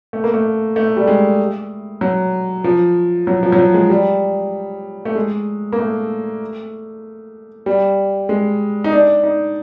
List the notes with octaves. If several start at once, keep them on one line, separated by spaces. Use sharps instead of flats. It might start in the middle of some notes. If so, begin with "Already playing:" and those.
A3
A#3
A3
A3
G3
G#3
F#3
F3
F#3
F3
F#3
F3
G#3
G3
A3
G#3
A#3
A3
G3
G#3
D#4
D4
D#4